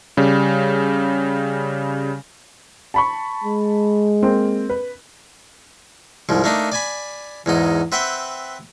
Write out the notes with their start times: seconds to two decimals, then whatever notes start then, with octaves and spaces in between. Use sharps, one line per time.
0.17 C#3 G3
2.94 A5 B5 C#6
3.44 G#3
4.23 A#3 C4
4.70 B4
6.29 C2 G#2 F3
6.44 A3 A#3 D4 D#4
6.72 D5 G#5 B5
7.46 E2 G#2 D#4
7.92 C4 B4 E5 F#5 G5